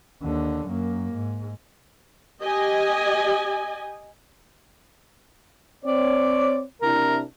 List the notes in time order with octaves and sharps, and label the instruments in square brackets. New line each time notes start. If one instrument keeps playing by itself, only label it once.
[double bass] D#2 D3
F#2 A#3
G#2
[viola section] G4 D#5 G#5
[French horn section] C4 C#5 [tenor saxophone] D5
[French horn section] C3 D4 E4 [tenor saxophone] A#4